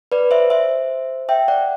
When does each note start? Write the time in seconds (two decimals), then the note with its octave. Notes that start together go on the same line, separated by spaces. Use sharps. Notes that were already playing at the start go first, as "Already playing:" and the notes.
0.12 B4 D5
0.31 C5 E5
0.50 C5 E5
1.29 E5 G5
1.48 D5 F#5